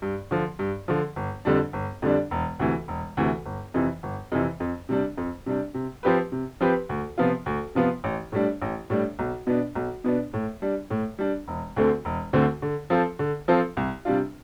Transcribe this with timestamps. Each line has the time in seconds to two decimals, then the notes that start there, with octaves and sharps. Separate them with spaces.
0.02 G2
0.31 D3 F3
0.59 G2
0.88 D3 F3
1.16 G1
1.45 F2 D3 G3 D4
1.73 G1
2.02 F2 D3 G3 D4
2.31 E1
2.59 D2 C3 E3
2.88 E1
3.17 D2 C3 E3
3.46 G1
3.74 F2 C3 E3
4.03 G1
4.32 F2 C3 E3
4.60 F2
4.89 C3 G3 D4
5.17 F2
5.46 C3 G3 D4
5.74 C3
6.03 F3 C4 G4 B4
6.32 C3
6.61 F3 C4 G4 B4
6.89 D2
7.18 C3 F3 B3 F4
7.46 D2
7.75 C3 F3 B3 F4
8.04 A1
8.32 A2 G3 D4
8.62 A1
8.90 A2 G3 D4
9.19 B1
9.47 B2 B3 D4
9.75 B1
10.04 B2 B3 D4
10.33 A2
10.62 G3 D4
10.90 A2
11.19 G3 D4
11.48 E1
11.76 D2 D3 A3 C4
12.05 E1
12.33 D2 D3 A3 C4
12.62 D3
12.90 F3 C4 F4 A4
13.19 D3
13.48 F3 C4 F4 A4
13.77 C2
14.05 C3 G3 D4 F4